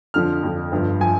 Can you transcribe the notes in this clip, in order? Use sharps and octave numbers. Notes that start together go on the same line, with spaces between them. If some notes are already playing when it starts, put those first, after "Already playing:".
F2 D3 F3 F6
F2 D3 F3
G1 G2 F3
F3 G#5